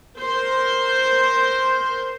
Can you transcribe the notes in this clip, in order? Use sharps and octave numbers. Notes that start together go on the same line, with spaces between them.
A#4 C5